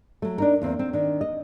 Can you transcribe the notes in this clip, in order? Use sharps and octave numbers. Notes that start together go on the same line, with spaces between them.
F#3 A3
D4 D#4 A#4
E2 A#3 C4
C4
D#3 D4
D#5